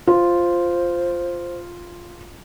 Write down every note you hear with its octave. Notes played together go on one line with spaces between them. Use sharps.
F4 C5